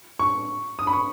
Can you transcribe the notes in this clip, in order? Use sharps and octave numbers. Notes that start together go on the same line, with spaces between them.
C#6
D#6
B5
C#6